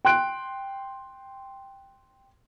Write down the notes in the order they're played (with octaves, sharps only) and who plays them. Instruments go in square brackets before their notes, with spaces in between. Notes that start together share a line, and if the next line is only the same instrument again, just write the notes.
[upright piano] G5 C6 F#6 D7